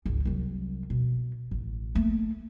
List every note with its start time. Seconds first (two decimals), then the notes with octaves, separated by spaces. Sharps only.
0.06 G#1 C#2
0.25 C2 F#3
0.90 B2
1.51 A1
1.95 A3 A#3